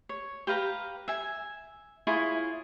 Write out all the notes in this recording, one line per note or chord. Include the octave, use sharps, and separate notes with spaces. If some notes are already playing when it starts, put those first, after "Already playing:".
C#5
G4 B4 F5 A#5
E5 G#5
E4 F4 G#4 C#5